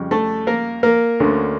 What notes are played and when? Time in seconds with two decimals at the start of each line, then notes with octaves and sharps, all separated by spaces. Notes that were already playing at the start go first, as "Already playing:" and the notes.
Already playing: F2 C#3 G3
0.11 A3 A4
0.47 A#3 A#4
0.83 A#3 A#4
1.20 D2 D3 A3 C#4